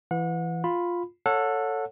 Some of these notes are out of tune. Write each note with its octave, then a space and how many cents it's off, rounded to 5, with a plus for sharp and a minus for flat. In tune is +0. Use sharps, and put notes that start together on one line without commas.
E3 +15 F#5 -35
F4 +5 B5 +5
A4 +10 C#5 +0 F#5 -30